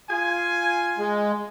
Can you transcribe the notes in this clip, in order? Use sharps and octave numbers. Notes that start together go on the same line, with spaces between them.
F4 G#5
G#3